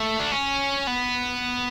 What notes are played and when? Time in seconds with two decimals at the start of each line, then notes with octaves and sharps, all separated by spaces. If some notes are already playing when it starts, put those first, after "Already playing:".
Already playing: A3
0.20 D4
0.32 C#4
0.87 B3